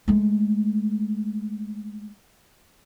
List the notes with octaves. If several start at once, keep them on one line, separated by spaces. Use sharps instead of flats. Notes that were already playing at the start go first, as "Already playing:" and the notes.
G#3 A3